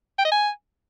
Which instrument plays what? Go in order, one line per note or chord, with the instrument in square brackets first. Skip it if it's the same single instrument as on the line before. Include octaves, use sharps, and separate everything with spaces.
[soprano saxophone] G5
D#5
G#5